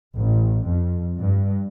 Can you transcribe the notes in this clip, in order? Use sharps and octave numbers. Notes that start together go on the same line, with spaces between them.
A1
F2
G2